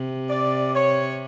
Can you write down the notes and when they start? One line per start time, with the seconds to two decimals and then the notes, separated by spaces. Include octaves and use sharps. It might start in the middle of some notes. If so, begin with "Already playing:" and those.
Already playing: C3
0.30 D5
0.75 C#5